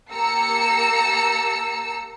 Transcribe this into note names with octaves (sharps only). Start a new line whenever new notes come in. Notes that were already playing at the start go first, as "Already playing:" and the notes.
A#3 G4 A5 A#5 E6 C#7